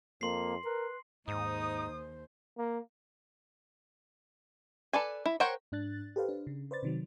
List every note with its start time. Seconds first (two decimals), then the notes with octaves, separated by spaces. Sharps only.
0.21 F2 A#3 C6 C7
0.64 A#4 B4
1.28 D#2 G#2 D#4 C5 D#6
2.58 A#3
4.93 A4 B4 D5 G#5
5.26 E4
5.40 A#4 C5 C#5 F#5 G5
5.72 G#2 D4 F#6 A6
6.16 G4 A4 B4 C5 F5
6.29 D4
6.47 C#3
6.71 B4 C5 D5 A6
6.83 C3 D#3 F#3